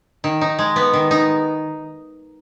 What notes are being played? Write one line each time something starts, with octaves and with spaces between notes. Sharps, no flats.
D#3
D#4
G#3
B3
D#3
D#4